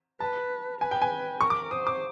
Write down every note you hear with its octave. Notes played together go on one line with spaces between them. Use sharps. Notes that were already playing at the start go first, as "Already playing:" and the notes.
B4 A5
B4 G#5
G5
G#5
A#4 C#6
D6
C5 D#6
D6